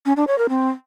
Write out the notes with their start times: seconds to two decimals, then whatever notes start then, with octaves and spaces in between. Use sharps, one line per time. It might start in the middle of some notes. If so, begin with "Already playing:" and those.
0.06 C#4
0.17 D4
0.27 C#5
0.38 A#4
0.49 C4